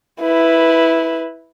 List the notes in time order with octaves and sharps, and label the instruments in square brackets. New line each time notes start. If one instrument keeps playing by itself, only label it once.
[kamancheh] E4 B4